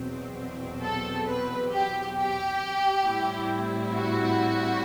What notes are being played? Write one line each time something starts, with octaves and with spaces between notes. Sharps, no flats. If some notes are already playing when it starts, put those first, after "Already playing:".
Already playing: E2 B2 F#3 C4
A4
B4
G4
G4
A2 G3 C4 E4
F#4